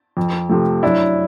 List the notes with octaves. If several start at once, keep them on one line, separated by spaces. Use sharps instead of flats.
F2
C3 F3 A3
F#2 D4 E4